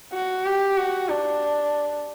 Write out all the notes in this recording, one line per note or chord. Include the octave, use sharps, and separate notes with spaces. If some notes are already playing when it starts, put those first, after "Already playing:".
F#4
G4
F#4
D4